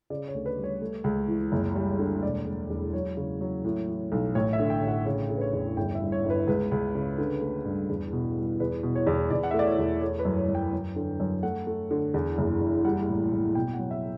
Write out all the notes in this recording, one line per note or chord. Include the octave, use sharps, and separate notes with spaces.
C#3 D5
C#5
D2
B4
G3
C#5
A3
C#2
E3
F#1
G3
D3
E1 D5
E1
E2
F#3 C#5
C#3
F#3
A2
E3
B1
A1 C#5
E5
D3
G5
A1
F#5
C#3 C#5
C#3
B4
C#5
E2
G1 G5
E5
G2
C#5
G1
B4
C#2 B4
C#2
C#3
D3
A3
G2
E2
B2
G3
E2 B4
B2
C#5
E2
E2 D5
F#5
E5
A3
D5
C#5
E2
A3 C#5
B4
F#2
C#5
F#2
G5
F#2
D3
F#2
A3 F#5
A3
D3
E2
F#1
E2
G3 F#5
A1
A1
B2 G5
F#5
F#3
E5